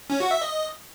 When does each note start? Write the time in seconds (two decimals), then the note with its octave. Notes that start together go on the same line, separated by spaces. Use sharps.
0.10 C#4
0.20 F#4
0.31 E5
0.42 D#5